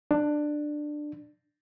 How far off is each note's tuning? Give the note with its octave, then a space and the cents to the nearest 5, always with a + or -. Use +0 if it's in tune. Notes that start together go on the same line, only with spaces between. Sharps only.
D4 +15